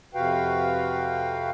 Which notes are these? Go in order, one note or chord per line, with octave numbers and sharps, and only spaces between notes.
F2 C3 F#4 B4 F5 G5